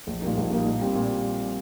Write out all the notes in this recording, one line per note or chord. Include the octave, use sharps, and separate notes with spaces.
A#1
A#2 G3 A#3 D#4
A#1
A#2 G3 A#3 D#4
A#2
G3 C4 G4
A#2